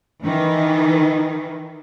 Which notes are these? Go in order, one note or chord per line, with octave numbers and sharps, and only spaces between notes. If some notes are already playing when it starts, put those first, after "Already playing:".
D#3 E3